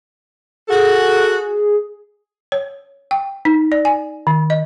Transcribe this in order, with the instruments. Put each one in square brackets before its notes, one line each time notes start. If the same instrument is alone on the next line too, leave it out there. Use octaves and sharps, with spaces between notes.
[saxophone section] F#4 A4 [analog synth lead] G#4
[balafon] C#5
G5
D#4
D5
G#5
D#3
D#5